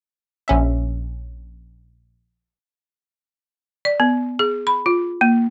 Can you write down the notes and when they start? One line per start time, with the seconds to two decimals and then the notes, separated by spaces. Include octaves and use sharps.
0.48 A#1 C#4 E5
3.85 D5
4.00 B3
4.39 G#4
4.67 B5
4.86 F4
5.21 A#3